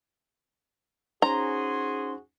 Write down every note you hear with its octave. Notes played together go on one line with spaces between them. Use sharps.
C#4 D#4 F#4 G#4 C5 A#5 C6